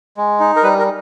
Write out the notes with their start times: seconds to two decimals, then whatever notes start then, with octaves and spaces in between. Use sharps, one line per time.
0.17 G#3
0.40 D#4
0.56 A#4
0.63 G3 B4
0.79 A#4